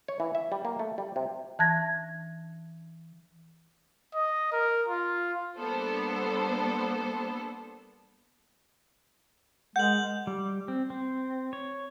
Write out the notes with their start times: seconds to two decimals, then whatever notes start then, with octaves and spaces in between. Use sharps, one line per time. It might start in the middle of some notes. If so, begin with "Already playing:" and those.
0.08 C#5
0.20 E3
0.35 E5
0.52 G3
0.65 A#3
0.79 A3
0.98 G3
1.16 C3
1.59 E3 A5 F#6 G#6 A#6
4.14 D#5
4.53 A#4
4.88 F4
5.58 G3 A#3 B3 D4 A4 C5
9.76 G#3 A#4 F#5 G6 F#7
10.27 G3
10.68 C4
10.90 C4
11.53 C#5